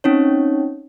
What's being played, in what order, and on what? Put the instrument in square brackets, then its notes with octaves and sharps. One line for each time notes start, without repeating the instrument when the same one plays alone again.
[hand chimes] C4 C#4 D#4 C#5